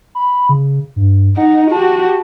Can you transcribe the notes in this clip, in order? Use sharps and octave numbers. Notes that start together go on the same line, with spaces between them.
B5
C#3
G2
D#4 F#5
F#4 G4 A5